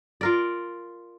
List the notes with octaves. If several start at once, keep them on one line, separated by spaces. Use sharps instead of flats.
F4 A#4 D5